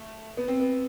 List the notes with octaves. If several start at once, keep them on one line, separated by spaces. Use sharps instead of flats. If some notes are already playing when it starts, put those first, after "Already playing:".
Already playing: A3
B3
C4
B3